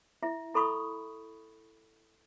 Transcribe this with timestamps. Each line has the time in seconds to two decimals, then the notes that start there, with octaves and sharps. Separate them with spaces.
0.23 E4 E5
0.54 E4 A4 B5 C#6 D#6